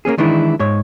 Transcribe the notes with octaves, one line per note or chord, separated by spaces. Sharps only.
A#3 B3 C#4 G#4
D#3 E3 G#3 D4 E4
G#2 C#5